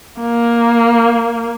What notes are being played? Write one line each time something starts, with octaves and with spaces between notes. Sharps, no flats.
A#3